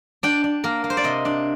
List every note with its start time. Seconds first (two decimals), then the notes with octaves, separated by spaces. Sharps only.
0.23 D4 G5
0.44 D4
0.64 A#3 A#4
0.84 A#3
0.90 C5
0.97 D5
1.04 C3 D#5
1.25 D4